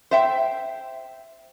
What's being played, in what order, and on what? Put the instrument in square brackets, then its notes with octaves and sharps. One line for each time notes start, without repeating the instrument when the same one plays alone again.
[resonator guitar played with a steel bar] C5 E5 G5